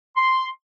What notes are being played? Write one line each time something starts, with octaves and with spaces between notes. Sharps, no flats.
C6